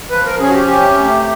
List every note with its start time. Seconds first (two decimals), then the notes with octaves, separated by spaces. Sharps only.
0.10 F3 B4
0.25 A#4
0.39 C#4 G#4
0.49 F#4
0.54 G4
0.68 C3 G4
0.99 A3